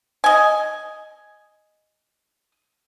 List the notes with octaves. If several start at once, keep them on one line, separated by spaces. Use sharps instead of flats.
D#5 G#5